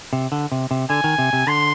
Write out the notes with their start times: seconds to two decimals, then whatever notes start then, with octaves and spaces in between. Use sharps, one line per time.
0.13 C3
0.32 D3
0.52 C3
0.71 C3
0.89 D3 G#5
1.04 D#3
1.18 C3
1.33 C3
1.47 D3 C6